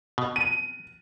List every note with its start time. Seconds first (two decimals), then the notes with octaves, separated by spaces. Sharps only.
0.18 B2
0.36 D#7